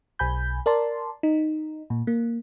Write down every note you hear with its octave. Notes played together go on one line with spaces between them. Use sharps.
B1 G#5 B5 G6
A#4 D5 A5 C6
D#4
A#2
A#3